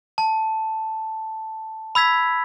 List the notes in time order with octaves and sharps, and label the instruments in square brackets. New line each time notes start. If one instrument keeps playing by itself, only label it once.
[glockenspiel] A5
B5 E6 G#6 B6